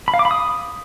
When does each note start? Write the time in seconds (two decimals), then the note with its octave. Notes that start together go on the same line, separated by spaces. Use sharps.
0.08 B5
0.14 F5
0.19 D6
0.25 B5
0.31 D#6